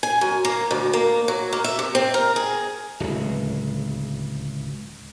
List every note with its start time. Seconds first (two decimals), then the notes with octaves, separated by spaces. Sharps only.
0.03 G#5
0.21 F#2
0.45 A#3
0.71 D2
0.93 A#3
1.28 F#3
1.53 A#3
1.64 E5
1.79 C3
1.95 C4
2.14 A#4
2.36 G#4
3.00 D1 C#2